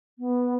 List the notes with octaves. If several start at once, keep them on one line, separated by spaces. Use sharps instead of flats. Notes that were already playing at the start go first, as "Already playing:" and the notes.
B3